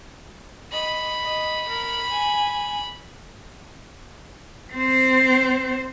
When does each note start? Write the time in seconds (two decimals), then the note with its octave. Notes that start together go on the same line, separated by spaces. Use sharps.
0.72 D#5 B5
1.23 D#5
1.69 A#4
2.10 G#5
4.74 C4 C5